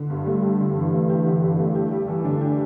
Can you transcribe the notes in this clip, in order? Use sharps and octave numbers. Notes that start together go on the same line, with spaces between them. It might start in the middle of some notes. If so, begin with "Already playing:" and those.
Already playing: D3
G2
G3 A3
G4
D3
G2 E3
A3
G4
D3
G2
A3
G4
G3
E3
D3 D4
G4